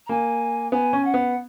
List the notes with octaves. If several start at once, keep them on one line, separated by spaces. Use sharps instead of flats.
A#5
A#3 G#5
B3 G#5
C#4
F#5
B3